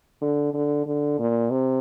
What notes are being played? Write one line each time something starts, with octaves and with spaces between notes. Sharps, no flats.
D3
D3
D3
A#2
C3